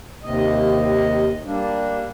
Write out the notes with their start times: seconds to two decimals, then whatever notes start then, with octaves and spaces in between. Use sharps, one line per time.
0.23 D#2 C3 D#5
1.46 G3 A#3 D4